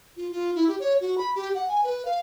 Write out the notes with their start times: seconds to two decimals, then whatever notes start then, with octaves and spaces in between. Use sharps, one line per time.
0.17 F4
0.31 F4
0.55 E4
0.68 G4
0.80 C#5
1.01 F#4
1.18 B5
1.36 G4
1.55 F#5
1.68 G#5
1.84 B4
2.05 F5